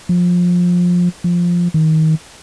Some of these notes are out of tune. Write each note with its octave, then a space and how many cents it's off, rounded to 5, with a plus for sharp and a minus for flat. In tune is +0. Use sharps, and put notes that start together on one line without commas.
F3 +20
F3 +0
D#3 +25